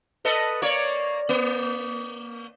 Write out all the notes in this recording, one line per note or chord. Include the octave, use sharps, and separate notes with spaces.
A4 B4 D#5
A#3 C#5 D5
A#3